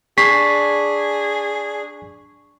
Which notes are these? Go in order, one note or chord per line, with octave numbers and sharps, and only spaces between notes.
D4 G#4 C#6 B6 C7